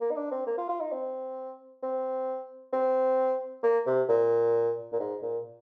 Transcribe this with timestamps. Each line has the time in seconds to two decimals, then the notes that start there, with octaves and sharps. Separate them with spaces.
0.01 A#3
0.11 D#4
0.16 D4
0.31 C4
0.46 A#3
0.58 F4
0.69 F4
0.80 D#4
0.92 C4
1.82 C4
2.73 C4
3.63 A#3
3.86 C3
4.09 A#2
4.93 A#2
4.99 G#2
5.22 A#2